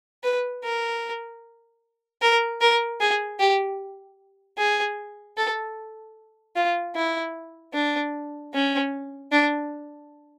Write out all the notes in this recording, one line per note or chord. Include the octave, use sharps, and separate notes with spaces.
B4
A#4
A#4
A#4
G#4
G4
G#4
A4
F4
E4
D4
C#4
D4